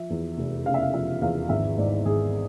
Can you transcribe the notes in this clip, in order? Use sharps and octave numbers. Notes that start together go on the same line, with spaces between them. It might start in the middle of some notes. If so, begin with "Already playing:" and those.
Already playing: F3 E5
E2
F1
C#3 F5
E5
F5
F3 E5
E2 F5
G#1 E5
G#2 D5
G#1 G#4